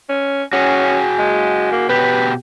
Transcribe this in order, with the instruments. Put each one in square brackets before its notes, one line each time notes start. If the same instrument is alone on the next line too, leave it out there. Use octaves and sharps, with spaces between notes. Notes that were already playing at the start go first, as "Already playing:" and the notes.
[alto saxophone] C#4
[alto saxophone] C#4 [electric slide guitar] F#4 G#4
[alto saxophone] G#3
A#3
[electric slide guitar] B2 G4 [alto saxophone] B4